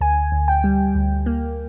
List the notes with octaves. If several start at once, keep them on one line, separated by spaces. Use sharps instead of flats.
D2 G#5
D2
G5
G3
D2
A#3